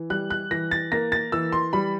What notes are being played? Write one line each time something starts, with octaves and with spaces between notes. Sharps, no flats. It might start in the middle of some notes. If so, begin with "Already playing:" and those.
Already playing: E3
G3 F#6
F#6
E3 A#6
A6
A#3 A#6
A6
E3 E6
C6
G3 B5